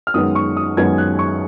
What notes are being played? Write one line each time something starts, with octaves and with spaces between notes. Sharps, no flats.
F6
F#2 D#3 G#3 B3 D#6
C#6
D#6
F#2 D#3 G#3 B3 G#6
F#6
C#6